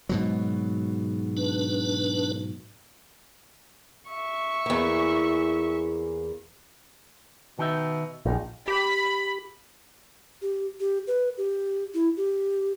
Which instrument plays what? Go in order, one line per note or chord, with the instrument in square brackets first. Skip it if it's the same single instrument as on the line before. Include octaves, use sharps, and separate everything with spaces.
[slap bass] G#2 B2 F#3
[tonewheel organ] D4 B4
[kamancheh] E5 C#6
[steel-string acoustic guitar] E2 A#3
[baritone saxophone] B2 [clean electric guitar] D#3 D#4 E5
[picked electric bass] A#1 [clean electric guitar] D#4
[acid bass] G4 [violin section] B5
[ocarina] G4
G4
B4
G4
E4
G4